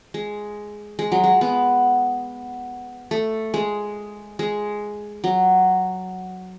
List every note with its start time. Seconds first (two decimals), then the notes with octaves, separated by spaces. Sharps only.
0.14 G#3
0.99 G#3
1.12 F#3
1.24 G#3
1.41 B3
3.11 A3
3.54 G#3
4.39 G#3
5.24 F#3